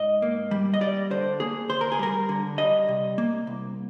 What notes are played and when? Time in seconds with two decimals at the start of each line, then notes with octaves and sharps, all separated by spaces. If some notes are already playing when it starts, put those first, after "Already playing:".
Already playing: G#2 D#5
0.22 A#3
0.51 G3
0.74 D#5
0.81 G3 D5
1.11 D3 C5
1.40 A#3 G#4
1.69 D2 C5
1.81 A#4
1.92 G#4
1.99 G3 A#4
2.29 D3
2.58 G3 D#5
2.88 C3
3.18 A#3
3.47 C2